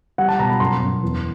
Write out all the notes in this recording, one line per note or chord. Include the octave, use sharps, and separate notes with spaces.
G3 F#5
A5
B2 A#5
B5
F#2 C6
F#2
E2